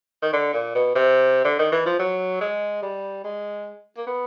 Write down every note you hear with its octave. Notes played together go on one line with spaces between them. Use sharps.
D#3
D3
A#2
B2
C3
D3
D#3
E3
F3
F#3
G#3
G3
G#3
A#3
B3